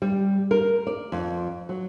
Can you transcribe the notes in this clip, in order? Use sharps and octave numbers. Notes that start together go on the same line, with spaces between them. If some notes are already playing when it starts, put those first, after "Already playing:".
G3
A#4
D5
F2
F#3